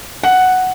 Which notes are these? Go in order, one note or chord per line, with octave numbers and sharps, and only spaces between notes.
F#5